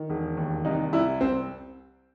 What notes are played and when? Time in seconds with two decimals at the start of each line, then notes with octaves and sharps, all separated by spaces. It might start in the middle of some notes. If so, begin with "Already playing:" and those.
Already playing: D#3
0.10 E1
0.37 D#2
0.65 C2 D#4
0.93 C2 E4
1.21 C2 C4